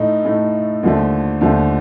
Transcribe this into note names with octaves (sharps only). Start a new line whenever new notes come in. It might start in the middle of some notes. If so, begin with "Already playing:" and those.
Already playing: A2 A3 D#4
A2 A3 D#4
D#2 D3 F3 A3
D#2 D3 F3 A3